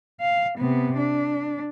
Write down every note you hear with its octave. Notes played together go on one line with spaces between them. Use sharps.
F5
C3 B3
D4